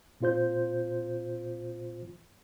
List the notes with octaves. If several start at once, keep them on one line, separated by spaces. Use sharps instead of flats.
A#2 C4 F4 C5 G6